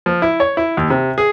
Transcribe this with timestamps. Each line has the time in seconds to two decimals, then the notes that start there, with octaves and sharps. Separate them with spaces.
0.06 F3
0.22 E4
0.40 C#5
0.57 E4
0.77 D#2
0.90 C3
1.18 G#4